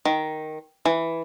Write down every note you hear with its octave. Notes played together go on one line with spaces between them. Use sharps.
D#3
E3